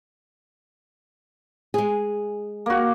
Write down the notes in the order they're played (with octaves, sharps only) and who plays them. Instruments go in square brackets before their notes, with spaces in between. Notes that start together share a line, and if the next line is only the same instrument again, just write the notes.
[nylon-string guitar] G#3 G#4
[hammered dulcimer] A#3 F#4